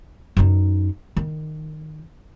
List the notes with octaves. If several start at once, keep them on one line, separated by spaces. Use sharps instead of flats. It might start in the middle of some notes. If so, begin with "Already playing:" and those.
F#2 D#4
D#3